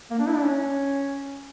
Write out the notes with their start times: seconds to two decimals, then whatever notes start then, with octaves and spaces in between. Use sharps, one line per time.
0.10 A#3
0.19 D4
0.27 E4
0.36 D4
0.44 C#4